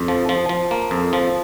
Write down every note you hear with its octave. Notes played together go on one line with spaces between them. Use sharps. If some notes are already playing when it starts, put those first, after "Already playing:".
Already playing: F2
F3
F3
F3
A#3
F2
F3